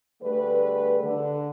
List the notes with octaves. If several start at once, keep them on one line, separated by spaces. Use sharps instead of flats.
D3 G3 A3 G#4 B4
D3